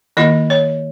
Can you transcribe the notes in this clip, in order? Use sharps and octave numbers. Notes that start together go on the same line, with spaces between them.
D#3 A#3 E4 D#5
C#5